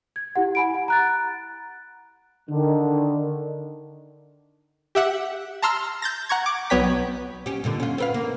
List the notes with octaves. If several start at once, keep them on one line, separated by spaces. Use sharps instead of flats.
G#6
E4 G4 F#5
G#5 B5 D7
F#5
A#5 F#6 A6
D3 D#3
G4 E5 F#5
A5 A#5 C6 E6 F6
G6 A6 A#6
F#5 A#5 C#6 G#6
D6
B1 F#3 B3 C#5 G5 B6
C#4 G4
G2 A#2 D3
C#4 F4
C4 B4 F5
A#3